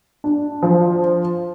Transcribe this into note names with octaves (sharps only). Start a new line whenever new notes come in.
D4
F3